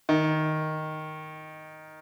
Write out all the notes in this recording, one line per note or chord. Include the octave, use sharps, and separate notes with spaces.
D#3